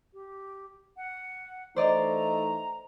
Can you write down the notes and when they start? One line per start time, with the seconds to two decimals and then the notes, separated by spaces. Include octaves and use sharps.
0.13 G4
0.97 F#5
1.76 E3 A3 D#4 C5 D5 D#5 A#5